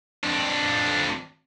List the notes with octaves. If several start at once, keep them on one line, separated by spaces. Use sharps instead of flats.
F2 D4